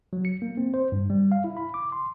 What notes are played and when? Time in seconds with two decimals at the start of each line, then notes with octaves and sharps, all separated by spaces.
0.13 F#3
0.25 C#7
0.42 A#3
0.57 C4
0.74 C5
0.92 G2
1.10 G3
1.32 F5
1.44 E4
1.57 B5
1.74 D6
1.92 C6